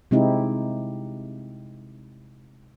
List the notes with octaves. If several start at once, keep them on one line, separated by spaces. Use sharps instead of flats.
C3 G#3 C4 D#4 E4 G4